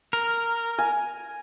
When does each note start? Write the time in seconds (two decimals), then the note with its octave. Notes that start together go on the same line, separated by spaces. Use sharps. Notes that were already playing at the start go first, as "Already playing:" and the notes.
0.13 A#4
0.78 G#5